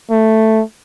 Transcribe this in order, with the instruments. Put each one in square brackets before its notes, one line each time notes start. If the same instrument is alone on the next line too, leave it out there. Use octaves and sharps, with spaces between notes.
[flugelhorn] A3